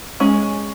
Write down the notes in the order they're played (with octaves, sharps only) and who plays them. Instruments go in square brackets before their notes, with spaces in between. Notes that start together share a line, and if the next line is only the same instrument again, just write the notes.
[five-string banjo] G#3 C#4